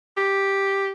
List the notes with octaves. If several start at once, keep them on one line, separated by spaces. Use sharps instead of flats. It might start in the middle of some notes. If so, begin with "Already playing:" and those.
G4